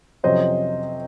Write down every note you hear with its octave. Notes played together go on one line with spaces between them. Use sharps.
F2 C3 F#3 C#4 C5 D#5